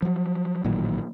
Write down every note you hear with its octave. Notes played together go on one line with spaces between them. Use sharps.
F3 F#3
A1 A#2 D#3 F#3